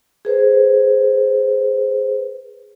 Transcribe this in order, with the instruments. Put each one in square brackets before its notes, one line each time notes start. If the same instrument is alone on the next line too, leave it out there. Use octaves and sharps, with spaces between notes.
[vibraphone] G#4 B4 C5